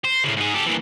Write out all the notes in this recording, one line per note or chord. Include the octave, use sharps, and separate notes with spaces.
C5
A2 C#3
G#2 G#4
G4 A4
E3 A#3